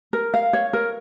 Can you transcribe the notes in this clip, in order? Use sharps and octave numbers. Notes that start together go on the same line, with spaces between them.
A#4
F5
C#5
A#4